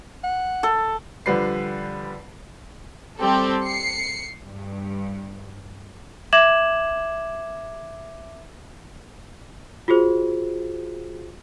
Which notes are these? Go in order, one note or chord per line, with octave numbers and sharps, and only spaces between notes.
F#5
A4
D3 F3 G3 B4 C7
G3 C4 G4 A4
C7 C#7
G2
E5 D6 G#6 E7 F#7
F4 F#4 G#4 C5